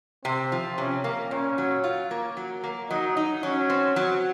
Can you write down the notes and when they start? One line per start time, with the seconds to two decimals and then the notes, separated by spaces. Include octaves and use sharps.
0.25 C3 C4
0.52 F3
0.78 C3 C#4
1.04 A#3
1.31 A#2 C#4
1.58 F#3
1.84 F4
2.11 A#3
2.37 F#3
2.64 A#3
2.89 F#3 D#4
3.17 D#4
3.43 F#3 C#4
3.70 C4
3.96 F#3